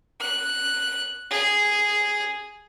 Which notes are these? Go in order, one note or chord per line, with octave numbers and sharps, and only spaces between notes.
F#6
G#4